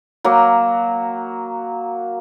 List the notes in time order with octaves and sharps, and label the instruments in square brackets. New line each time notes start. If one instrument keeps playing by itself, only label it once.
[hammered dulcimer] F#3 A#3